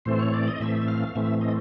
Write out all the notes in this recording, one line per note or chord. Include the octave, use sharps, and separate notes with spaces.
A2 E3 A3 C4 C5
C#5
D5
D#5
A2 E3 A3 C4 E5
E5
F5
A2 E3 A3 C4 E5
D#5